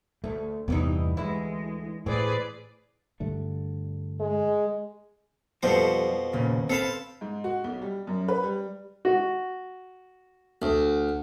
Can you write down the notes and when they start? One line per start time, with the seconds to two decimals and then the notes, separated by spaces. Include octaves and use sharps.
0.24 D2 A3
0.68 E2 G2 C3 E3 B3 D#4
1.17 D2 E3 G#3 E4
2.06 A2 E3 C4 G#4 B4 D5
3.20 G2 D3 A3
4.20 G#3
5.63 F2 B2 F3 G3 A4 C5
6.33 D#2 A#2 C#3
6.70 C4 A4 B4 F5 A5
7.21 G#2
7.44 F#4
7.64 B1
7.82 G3
8.07 F#2
8.28 B4
8.43 G3
9.05 F#4
10.62 D2